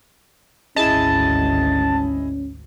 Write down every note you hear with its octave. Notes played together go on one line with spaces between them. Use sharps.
G#1 D2 C#4 E4 G#4 D#5 A5